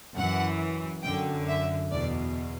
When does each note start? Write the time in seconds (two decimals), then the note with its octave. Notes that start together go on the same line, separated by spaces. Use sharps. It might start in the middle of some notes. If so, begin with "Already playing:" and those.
0.15 F#2 E3 F#5
1.03 F#2 D3 G5
1.47 E5
1.91 E2 B2 D5